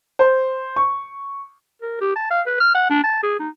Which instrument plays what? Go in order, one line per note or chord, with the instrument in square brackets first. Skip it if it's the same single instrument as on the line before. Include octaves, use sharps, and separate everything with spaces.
[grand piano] C5
C#6
[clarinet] A#4
G4
A5
F5
B4
F6
F#5
D4
A5
G#4
D#4